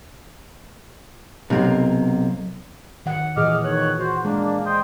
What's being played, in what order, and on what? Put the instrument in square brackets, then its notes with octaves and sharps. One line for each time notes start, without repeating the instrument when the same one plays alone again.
[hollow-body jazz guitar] B1 [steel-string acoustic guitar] C3 A#3
[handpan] D#3 F#5
[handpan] A#2 E3 G#4 [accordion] D#5 D6 F6
[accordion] D#3 C#5 F#6
F#4 C5
[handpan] G#3 [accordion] A#3 D4
[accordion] C5 D#5 G5